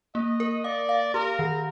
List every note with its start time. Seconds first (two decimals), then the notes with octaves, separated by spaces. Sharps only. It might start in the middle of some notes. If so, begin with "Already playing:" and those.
0.15 A#3 D#5
0.40 A#4
0.64 D5 F5
0.89 F5
1.14 G4 A#4
1.39 D#3